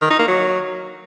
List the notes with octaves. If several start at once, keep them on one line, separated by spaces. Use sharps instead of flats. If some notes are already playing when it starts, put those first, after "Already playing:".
D#3
D#4
A#3
F#3